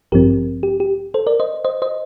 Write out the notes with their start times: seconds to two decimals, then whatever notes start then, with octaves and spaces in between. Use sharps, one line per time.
0.12 A1 G2 F3 C4 G4 A#4
0.63 G4
0.80 G4
1.14 A4 C5
1.27 A#4 D5
1.40 C5 D#5
1.64 C5 D#5
1.82 C5 D#5